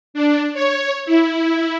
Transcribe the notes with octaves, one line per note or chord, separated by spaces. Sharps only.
D4
C#5
E4